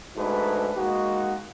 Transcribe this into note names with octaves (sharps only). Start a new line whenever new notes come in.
G#2 A3 D4 F#4 B4
G#3 A#3 D#4 F#4